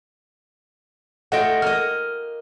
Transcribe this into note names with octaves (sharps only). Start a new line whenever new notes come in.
A3 F4 D#5 F#5 G5
A#3 D#5 F6